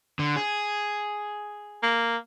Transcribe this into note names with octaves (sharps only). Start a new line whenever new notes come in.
D3
G#4
A#3